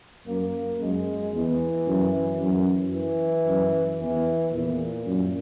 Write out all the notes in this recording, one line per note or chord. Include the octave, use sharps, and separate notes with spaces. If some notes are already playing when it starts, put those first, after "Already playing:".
F#2 A#3
F#2 G#3
E2 E3
F#2
F#2
E3
F#2
E2 E3
E2 A#2
F#2